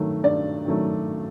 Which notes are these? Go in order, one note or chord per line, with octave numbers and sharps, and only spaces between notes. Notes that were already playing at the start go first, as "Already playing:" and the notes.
Already playing: G2 D#3 F#3 A3
G2 D5
D#3 F#3 A3